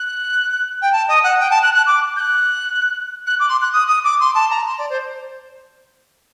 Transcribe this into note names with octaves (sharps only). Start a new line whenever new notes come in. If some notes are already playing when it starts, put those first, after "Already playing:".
Already playing: F#6
G5
A5
D#5
F#5
G5
A5
F#6
F#6
D6
G6
F#6
F#6
D6
C6
F#6
D#6
D#6
D6
C6
A5
A#5
C6
D5
C5